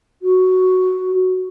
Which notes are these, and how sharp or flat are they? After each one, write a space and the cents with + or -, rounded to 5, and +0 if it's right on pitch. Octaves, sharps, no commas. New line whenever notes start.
F#4 +0